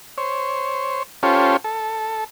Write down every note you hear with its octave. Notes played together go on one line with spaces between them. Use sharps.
C5 C#5
C#4 F4 G4 A4 C5 C#5
A4